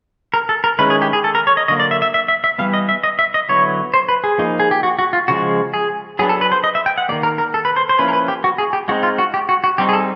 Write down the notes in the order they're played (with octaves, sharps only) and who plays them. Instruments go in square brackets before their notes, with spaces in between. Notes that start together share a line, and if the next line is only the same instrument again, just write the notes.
[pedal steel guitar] A#4
A4
A#4
D#3 G#3 C#4 E4 B4
G#4
G4
G#4
A4
A#4
C#5
D#5
D3 F#3 A#3 D#5
D5
E5
E5
E5
E5
E5
E3 G3 B3 F5
D#5
E5
D#5
E5
D#5
D3 F#3 B3 E4 C#5
C5
B4
G#4
F3 A#3 D#4
G#4
G4
F#4
F#4
F4
C#3 F3 G#3 F#4
G#4
F#3 B3 D4 G#4
A4
B4
C5
D#5
E5
G5
F#5
D#3 G3 A#3 D5
A#4
A#4
A4
B4
C5
C5
F3 A#3 C#4 E4 B4
A#4
B4
G4
F#4
G#4
G4
G#3 C4 D#4 F#4
F4
F#4
G4
F#4
F#4
G3 C4 D#4 G4
G#4
A4